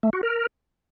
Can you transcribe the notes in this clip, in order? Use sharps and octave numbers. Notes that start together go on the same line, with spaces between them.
A3
F#4
A#4